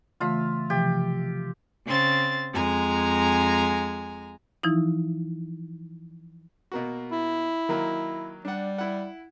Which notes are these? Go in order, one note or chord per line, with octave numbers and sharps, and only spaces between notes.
C#3 E3 A3 F4 E5
C3 E3 F3 G4
C#3 C4 A6
F2 G#3 G#5 A#5
E3 F3 D#4 E4
B2 A#3 F#4
E4
D#3 F#3 A#3
G3 D4 F#5
E4 F#5